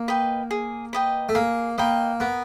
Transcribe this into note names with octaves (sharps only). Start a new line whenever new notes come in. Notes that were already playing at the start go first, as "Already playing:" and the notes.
Already playing: A#3
B4 D#5 G5
G#4
B4 D#5 G5
A3
A#3 G#4
A#3 B4 D#5 G5
B3 A#4